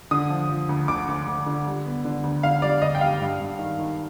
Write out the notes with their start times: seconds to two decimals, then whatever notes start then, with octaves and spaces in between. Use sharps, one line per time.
0.11 D3 D#6
0.30 F3
0.50 F3
0.69 D2
0.88 D2 D6
1.08 D2
1.27 D2
1.46 D3
1.66 G3
1.85 B3
2.05 D3
2.23 D2
2.43 D3 F5
2.62 G3 D5
2.82 D2 D#5
2.95 G5
3.01 G3 F5
3.21 G2
3.40 G2
3.59 D#3
3.79 D#3